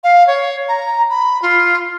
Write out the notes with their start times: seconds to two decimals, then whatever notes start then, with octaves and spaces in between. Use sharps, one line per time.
0.03 F5
0.27 C#5
0.68 A#5
1.10 B5
1.42 F4